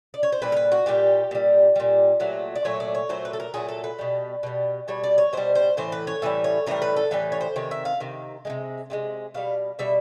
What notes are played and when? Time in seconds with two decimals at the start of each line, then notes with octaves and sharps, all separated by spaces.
0.14 D5
0.23 C#5
0.32 C5
0.42 A#2 G3 B4
0.52 A#4
0.57 B4
0.72 F#4
0.86 A#2 G3 G4
1.31 A#2 G3
1.76 A#2 G3
2.20 A#2 F#3 A3
2.55 D5
2.65 A#2 F#3 A3 C#5
2.80 D5
2.95 C#5
3.09 A#2 F#3 A3 C5
3.25 B4
3.33 A4
3.40 A#4
3.54 A#2 F#3 A3 G#4
3.69 A4
3.84 B4
3.99 B2 G3
4.43 B2 G3
4.88 B2 G3 C#5
5.04 D5
5.18 C#5
5.33 B2 G3 C5
5.55 C5
5.77 A2 E3 C5
5.92 B4
6.07 C#5
6.22 A2 E3 G3 E5
6.44 C#5
6.66 A2 E3 G3 A#4
6.82 B4
6.96 A4
7.11 A2 E3 G3 B4
7.32 C#5
7.41 C5
7.56 C3 D#3 C#5
7.71 E5
7.85 F5
8.00 C3 D#3
8.45 D#3 G#3
8.50 C3
8.90 C3 D#3 G#3
9.34 B2 G3 F5
9.79 B2 G3 E5